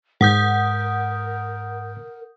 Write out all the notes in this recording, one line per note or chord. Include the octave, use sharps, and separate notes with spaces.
G#2 A#4 F#5 D#6 G6